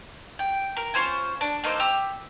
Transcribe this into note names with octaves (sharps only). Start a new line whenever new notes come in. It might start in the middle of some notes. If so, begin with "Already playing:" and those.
G5
A#4
C#4 F4 C5 G#5
D4
A#3 D#4 A4 C5
G4 E6